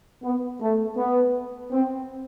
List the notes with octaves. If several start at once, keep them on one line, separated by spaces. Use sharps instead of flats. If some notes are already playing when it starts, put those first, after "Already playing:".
B3
A3
B3
C4